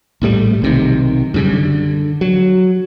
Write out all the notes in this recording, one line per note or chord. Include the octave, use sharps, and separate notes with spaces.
A#1 A2 G3 A3
B1 C3 D#3
F#2 C#3 G3
D3
F#3